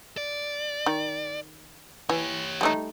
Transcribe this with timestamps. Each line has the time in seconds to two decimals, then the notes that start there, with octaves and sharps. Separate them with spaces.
0.17 D5
0.86 D#3
2.09 E3 G4 C#5
2.61 G3 A3 D#4